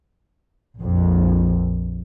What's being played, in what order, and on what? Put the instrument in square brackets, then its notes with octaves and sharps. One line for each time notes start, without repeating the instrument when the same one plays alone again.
[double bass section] A#1 F2